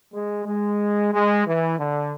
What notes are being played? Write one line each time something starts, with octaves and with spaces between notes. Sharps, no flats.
G#3
G#3
G#3
E3
D3